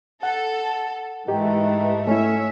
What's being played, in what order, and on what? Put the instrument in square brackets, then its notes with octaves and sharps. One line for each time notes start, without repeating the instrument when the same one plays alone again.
[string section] A4 [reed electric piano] F#5
[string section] G#2 E3 A3 [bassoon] D#3 [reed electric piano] G4
[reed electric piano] A3 E4 [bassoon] C#4 [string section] C#5 E5